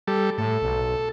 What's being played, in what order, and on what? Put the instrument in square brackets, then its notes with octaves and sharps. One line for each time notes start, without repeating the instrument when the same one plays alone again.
[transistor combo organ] G3 A4
[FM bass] A2 [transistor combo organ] A4
[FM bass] B1